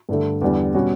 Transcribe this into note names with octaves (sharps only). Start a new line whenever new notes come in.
G2 D3 A3
E2 D3 G3
B2 G3 C#4 F#4